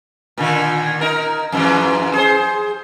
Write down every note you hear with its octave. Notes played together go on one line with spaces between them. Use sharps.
A#2 D3 D#3
D#4 A#4
F2 G#2 E3
G#4 C5